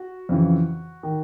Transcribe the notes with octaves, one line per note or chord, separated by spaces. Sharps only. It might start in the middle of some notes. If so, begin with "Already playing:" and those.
Already playing: F#4
F2 C#3 E3
D#3